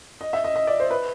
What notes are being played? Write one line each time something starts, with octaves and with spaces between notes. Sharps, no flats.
D#5
E5
D#5
D#5
D5
C5
B4